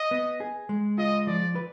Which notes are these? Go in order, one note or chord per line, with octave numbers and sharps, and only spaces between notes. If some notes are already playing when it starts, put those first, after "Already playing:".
Already playing: D#5
B3
G#4
G#3
F4 D#5
F3 D5
B4